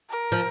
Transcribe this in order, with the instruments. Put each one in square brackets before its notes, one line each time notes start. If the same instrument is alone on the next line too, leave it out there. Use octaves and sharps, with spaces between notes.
[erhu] A#4
[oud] F3